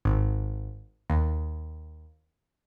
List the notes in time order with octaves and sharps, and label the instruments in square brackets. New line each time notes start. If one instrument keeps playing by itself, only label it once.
[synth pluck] G#1
D#2